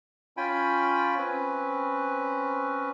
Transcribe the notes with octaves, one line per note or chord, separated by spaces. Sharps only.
C#4 F4 G5 G#5 B5
C4 C#4 B4